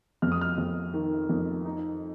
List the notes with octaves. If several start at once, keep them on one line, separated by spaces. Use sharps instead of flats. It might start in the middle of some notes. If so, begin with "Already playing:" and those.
F2 F6
D#6
F6
F2
D#3
F2
D#4